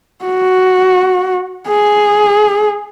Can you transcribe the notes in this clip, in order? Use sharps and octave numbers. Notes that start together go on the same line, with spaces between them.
F#4
G#4